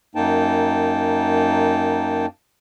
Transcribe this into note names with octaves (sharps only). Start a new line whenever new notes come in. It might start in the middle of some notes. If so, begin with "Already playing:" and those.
F#2 A#3 D#4 G5 A5